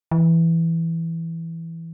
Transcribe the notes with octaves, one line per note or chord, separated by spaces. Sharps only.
E3